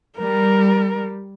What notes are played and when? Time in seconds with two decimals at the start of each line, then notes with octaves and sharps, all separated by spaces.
0.19 G3 A#4